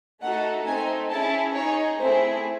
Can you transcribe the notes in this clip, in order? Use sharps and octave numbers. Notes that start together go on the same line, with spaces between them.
A3 D#4 F#4 A4 F#5
A3 C4 D#4 G#5
C#4 E4 G#4 A5
D#4 G#4 C#5
A3 C4 E4 G#4 C5